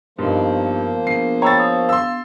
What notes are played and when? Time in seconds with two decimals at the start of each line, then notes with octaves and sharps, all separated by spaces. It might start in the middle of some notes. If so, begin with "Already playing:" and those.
0.19 G2 F3 A#3 B3 D#4 C5 D5
1.07 B3 D4 G#4 C7
1.42 C#5 G5 A#5 B5 E6 A6
1.59 D#6
1.89 F5 C6 E6